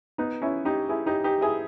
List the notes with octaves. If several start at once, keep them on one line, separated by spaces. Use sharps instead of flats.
B3 D#4
C#4 E4
D#4 G4
E4 G#4
D#4 G4
D#4 G4
E4 G#4